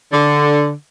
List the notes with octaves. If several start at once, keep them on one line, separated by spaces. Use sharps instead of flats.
D3